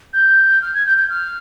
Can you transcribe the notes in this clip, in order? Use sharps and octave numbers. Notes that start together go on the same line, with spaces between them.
G6
F6
G#6
G6
G6
F6